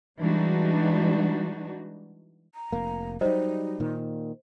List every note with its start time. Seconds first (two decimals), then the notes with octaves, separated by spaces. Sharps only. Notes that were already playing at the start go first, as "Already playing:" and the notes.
0.19 E3 G3 G#3 D4 D#4 F#4
2.53 A#5
2.72 F1 A#3
3.21 F#3 G3 D#4 C5 D#5 A#5
3.80 A#2 D#3